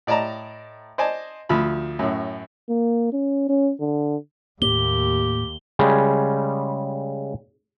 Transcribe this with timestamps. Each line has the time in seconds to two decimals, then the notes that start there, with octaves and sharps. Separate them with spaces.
0.07 A2 D5 D#5 A5 A#5
0.98 C5 D5 D#5 G#5 A5
1.49 D2 F3 B5
1.99 F#2 A2
2.69 A#3
3.12 C#4
3.49 C#4
3.80 D3
4.62 D#2 A2 A#3 G4 G7
5.79 C#3 G3 G#3